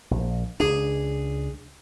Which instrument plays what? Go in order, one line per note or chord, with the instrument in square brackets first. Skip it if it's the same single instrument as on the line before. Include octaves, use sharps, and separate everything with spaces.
[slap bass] A#1
[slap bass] C#2 D4 [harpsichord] G#4